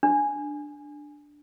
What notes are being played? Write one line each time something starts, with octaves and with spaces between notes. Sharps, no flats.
D4